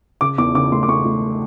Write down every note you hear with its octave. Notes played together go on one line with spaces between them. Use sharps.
C#3 D6
E2 D6
C#3 D6
A3 C6
D6
A3 C#6
A3